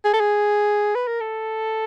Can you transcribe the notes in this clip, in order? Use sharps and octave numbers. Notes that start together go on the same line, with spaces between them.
G#4
A4
G#4
B4
A#4
A4